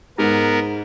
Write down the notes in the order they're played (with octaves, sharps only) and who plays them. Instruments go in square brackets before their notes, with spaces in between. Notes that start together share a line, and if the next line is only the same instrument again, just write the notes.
[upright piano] G#2 [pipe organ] B3 A#4